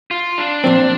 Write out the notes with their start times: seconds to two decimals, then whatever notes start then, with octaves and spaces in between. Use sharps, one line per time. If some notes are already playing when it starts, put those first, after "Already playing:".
0.11 F4
0.38 D4
0.64 A#2 F3 C4